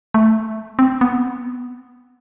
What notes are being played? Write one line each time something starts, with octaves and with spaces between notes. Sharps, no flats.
A3
C4
B3